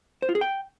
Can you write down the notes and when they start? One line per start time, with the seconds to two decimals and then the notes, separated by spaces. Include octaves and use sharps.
0.22 C5
0.29 F4
0.35 G#4
0.41 G5